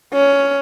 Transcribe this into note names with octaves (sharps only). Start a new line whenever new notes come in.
C#4